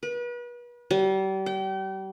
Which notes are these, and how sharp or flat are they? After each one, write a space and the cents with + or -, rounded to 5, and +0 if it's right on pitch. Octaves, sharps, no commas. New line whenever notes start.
B4 -35
G3 -35
G5 -35